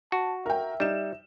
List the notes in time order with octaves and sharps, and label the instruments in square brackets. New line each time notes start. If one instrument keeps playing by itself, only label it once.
[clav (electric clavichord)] F#4 [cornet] A5
[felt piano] A#4 G5 [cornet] E5
[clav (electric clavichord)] G3 [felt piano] D#4 E7